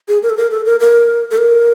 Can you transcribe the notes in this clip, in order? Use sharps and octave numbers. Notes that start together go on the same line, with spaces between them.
G#4
A#4
A4
A#4
A4
A#4
A#4
A4
A#4